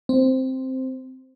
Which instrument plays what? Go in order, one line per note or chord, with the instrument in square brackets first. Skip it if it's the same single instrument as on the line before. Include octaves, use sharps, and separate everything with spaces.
[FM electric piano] C4